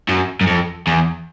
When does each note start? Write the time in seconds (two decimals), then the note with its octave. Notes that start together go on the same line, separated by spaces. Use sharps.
0.09 F#2
0.41 F#2
0.47 F2
0.87 E2